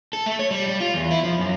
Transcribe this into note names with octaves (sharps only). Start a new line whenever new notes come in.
A4
A3
C#5
G3
G3
F4
E2
E4
F3
F#2